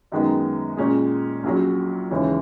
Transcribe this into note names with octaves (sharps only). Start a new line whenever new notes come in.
F#2 D#3 G#3 B3
A#2 G#3 C#4 G#4
A#1 A#2 F#3 C#4
D#2 C#3 E3 G#3